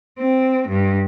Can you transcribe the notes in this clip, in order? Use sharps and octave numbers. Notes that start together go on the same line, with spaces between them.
C4
G2